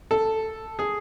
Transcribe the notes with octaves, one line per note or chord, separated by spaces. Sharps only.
A4
G#4